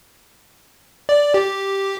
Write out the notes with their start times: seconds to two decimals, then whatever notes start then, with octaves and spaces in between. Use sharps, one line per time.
1.09 D5
1.34 G4